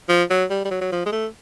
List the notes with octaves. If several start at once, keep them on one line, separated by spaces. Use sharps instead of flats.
F3
F#3
G3
G3
F#3
F#3
F3
G#3
A3